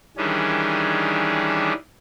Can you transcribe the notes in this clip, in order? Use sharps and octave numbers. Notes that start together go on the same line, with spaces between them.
D#3 E3 G3 C#4 D4 G#4